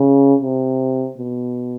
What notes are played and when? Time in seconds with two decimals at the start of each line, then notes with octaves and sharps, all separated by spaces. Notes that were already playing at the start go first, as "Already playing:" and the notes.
Already playing: C#3
0.42 C3
1.18 B2